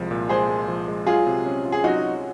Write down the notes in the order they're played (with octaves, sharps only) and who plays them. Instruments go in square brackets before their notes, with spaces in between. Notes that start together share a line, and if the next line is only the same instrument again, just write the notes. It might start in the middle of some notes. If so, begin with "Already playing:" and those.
Already playing: [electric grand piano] C2 F3 G#3
A#2
[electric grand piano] G#3 [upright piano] G#4 C5
[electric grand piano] G#3
F3
G#3
[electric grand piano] F#3 [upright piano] F4 G#4
[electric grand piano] C3
C#4
F4
[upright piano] G#4
[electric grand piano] F#3 [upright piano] D#4 F#4
[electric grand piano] F#3